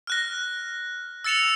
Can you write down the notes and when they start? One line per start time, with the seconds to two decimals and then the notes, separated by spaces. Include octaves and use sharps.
0.07 F6 F#6 A#6
1.24 E6 A6 C#7 E7 F7